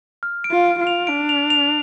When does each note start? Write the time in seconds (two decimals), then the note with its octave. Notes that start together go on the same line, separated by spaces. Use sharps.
0.23 F6
0.44 D7
0.51 F4
0.66 D7
0.79 F4
0.87 F7
1.07 D4 D7
1.29 F7
1.50 F7